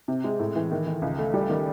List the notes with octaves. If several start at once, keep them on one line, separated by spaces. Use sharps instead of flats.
C3
G#3
A2
E3
D#3
D#3
C#2
A3
G3
D#3